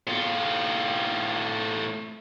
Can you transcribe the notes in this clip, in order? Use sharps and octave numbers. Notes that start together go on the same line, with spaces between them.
A2 F4